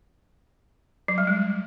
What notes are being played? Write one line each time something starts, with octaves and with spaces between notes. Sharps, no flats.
F#3
G3
G#3